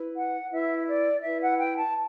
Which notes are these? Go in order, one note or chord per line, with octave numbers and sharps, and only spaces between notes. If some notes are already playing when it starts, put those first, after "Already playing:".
Already playing: E4 B4
F#5
E4 B4 E5
D5
E4 B4 E5
F#5
G5
A5